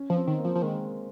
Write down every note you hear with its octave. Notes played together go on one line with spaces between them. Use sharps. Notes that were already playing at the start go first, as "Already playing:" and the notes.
Already playing: C#4
F3
C4
D#3
A#3
F3
F3
D#3 G#3